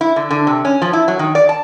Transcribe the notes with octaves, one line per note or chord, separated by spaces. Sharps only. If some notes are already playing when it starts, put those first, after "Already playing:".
E4
D3
D3
C3
C#4
F3
E4
F#3
D#3
D5
A5